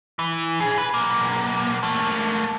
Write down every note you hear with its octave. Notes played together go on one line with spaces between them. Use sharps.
E3
A#2 G#4
A#2 B4
B1 A#3
A3 A#3